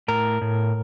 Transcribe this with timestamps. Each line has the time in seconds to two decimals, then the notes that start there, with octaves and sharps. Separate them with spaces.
0.08 A2 A#4
0.41 A2